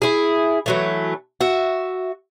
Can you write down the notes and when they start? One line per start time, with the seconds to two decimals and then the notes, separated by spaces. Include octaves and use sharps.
0.02 E4 G#4
0.66 E3 F#3 A3
1.41 F#4 E5